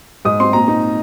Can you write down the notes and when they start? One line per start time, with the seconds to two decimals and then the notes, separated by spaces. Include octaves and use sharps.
0.25 G#2 D#6
0.40 C4 C6
0.53 A#2 A#5
0.68 D#4